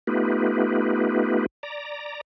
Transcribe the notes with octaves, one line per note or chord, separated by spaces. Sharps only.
A3 B3 D#4 F4 G4 B4
D5 A#5